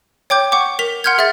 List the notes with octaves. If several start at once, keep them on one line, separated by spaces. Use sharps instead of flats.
C#5 G5 D6 G6
F#5 C#6 D6
A#4 B6 F7
F#5 C6 F6 G6 G#6
G#4 E5 F#5 A6